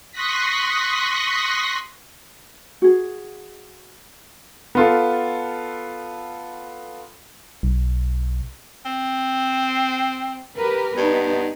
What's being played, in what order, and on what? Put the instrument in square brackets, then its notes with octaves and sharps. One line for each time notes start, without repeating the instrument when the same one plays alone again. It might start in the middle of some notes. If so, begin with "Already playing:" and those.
[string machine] C6 C#6 D#6 F#6 A#6 B6
[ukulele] F#4 G#4
[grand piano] B3 F4 A4
[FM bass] B1
[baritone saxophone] C4
[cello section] G4 A#4 B4
[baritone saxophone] G2 [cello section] B3 D#4